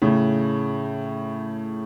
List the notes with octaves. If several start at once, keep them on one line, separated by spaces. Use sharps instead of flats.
A2 C#3